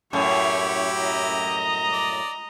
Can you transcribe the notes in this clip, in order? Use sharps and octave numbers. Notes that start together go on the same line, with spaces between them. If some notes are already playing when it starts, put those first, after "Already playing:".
F#2 A2 E4 G4 C#5
D#5 A#5
D5